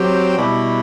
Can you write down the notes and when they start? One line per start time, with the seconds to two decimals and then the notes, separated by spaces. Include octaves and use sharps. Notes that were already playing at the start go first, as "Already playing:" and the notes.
Already playing: F#3 C4 G4
0.36 B2 G3 B3 E4